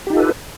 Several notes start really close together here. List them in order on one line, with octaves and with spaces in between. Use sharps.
G4 D#4 F4 A4 B4